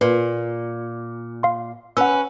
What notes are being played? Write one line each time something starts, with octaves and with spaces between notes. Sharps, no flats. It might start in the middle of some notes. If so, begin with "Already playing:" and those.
A#2 B4
F5 C6
C#4 B4 F#5 E6